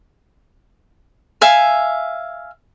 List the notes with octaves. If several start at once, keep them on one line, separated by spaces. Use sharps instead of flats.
E5 F5 G#5